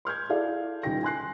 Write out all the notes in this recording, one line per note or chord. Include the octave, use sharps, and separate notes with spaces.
C6 F6 G6 G#6
E4 G#4 A4 D5 F5
C#2 D#3 G3 G5 A#6
G#5 C6 F#6 C7